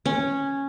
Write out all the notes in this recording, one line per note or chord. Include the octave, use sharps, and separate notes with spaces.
C#4